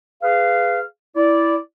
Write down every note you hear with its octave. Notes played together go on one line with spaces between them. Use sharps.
G#4 B4 F5
E4 D5